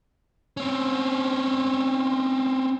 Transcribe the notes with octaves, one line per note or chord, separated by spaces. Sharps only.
C4 C#4